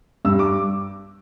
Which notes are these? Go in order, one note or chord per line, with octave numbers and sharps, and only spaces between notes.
G2 E6
D6